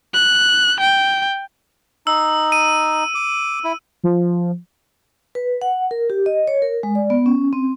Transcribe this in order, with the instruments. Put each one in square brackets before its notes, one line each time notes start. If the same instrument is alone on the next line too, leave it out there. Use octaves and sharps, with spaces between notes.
[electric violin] F#6
G5
[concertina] D#4 [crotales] E6
[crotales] D#7
[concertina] D6
E4
[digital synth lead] F3
[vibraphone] B4
F#5
A#4
G4
D#5
C#5
A#4
G#3
D5
B3
C#4
C4